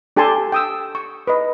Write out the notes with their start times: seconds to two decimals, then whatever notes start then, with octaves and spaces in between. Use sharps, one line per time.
0.16 D4 G4 A4 G#5 A5 C6
0.52 G5 D#6 E6
0.95 C#6
1.27 B4 D#5